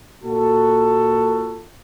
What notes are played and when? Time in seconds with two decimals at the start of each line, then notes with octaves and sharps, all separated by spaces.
0.24 A#2 F#4 A4